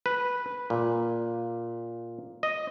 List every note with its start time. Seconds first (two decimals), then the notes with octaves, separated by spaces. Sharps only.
0.06 B4
0.70 A#2
2.43 D#5